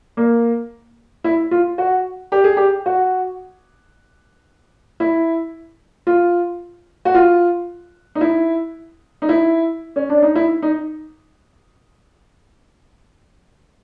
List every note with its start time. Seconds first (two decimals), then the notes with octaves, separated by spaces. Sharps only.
0.17 A#3
1.24 E4
1.51 F4
1.78 F#4
2.32 G4
2.44 G#4
2.57 G4
2.86 F#4
5.00 E4
6.07 F4
7.05 F#4
7.15 F4
8.15 D#4
8.21 E4
9.22 D#4
9.29 E4
9.96 C#4
10.09 D4
10.22 D#4
10.35 E4
10.62 D#4